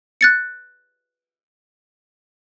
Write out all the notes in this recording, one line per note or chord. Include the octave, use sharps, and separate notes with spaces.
F#6 A6 C#7